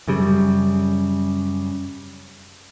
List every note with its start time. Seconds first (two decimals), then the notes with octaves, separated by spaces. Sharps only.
0.08 F#2 C#3 G3